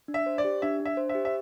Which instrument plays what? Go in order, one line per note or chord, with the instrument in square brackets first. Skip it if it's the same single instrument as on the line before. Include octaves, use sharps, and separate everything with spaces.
[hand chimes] D4
[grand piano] E5
[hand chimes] C5
[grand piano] D5
[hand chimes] G4
[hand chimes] D4 [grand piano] E5
[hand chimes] D4
[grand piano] E5
[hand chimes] C5
[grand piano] E5
[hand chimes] G4
[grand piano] E5